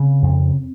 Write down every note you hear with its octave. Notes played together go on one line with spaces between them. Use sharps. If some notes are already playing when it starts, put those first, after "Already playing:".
Already playing: C#3 C4
F2